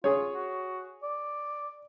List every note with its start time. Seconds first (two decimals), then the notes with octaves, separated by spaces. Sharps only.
0.04 F4 G#4 C#5
0.34 F#4
1.03 D5